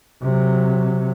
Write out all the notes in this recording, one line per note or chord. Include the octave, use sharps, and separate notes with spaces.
C3 F#3